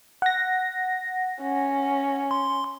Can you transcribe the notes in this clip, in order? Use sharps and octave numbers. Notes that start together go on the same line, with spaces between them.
F#5 A#6
C#4
C6